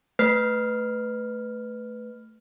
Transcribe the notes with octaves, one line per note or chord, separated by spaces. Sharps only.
A3 B4 F6